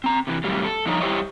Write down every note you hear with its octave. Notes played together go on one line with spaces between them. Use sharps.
C4 A#5
C3 E3
A2 C3 D#3 F#3 G3 A#3
A4
G2 D3 F3 D#4 C#5 A#5
G3 E4 G4 C5 C#5 D#5